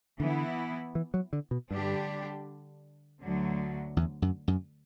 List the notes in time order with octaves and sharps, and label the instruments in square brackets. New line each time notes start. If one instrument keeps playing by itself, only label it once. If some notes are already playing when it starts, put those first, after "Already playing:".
[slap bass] D3 [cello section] E3 B3 E4
[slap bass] E3
F#3
D3
B2
[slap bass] G2 [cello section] D3 G3 D4 G4
[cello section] D2 D3 F#3
[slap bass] E2
F#2
F#2